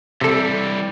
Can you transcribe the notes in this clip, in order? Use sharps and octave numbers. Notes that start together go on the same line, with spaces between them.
C3 E3 G3 A4